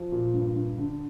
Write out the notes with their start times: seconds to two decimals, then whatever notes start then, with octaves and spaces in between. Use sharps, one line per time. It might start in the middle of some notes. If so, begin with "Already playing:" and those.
Already playing: F3
0.12 A#2
0.34 G2
0.56 G2
0.78 D3